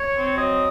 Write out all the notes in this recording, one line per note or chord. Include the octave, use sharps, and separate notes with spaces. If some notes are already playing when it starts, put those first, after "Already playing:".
Already playing: C#5
C4
F#3 D#5